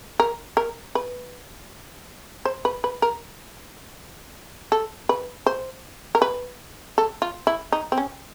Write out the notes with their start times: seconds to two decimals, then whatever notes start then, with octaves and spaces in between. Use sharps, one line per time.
0.20 A#4
0.57 A#4
0.95 B4
2.45 C5
2.65 B4
2.84 B4
3.02 A#4
4.72 A4
5.09 B4
5.46 C5
6.15 A#4
6.22 B4
6.98 A4
7.22 F4
7.47 E4
7.72 D#4
7.92 C4
7.98 C#4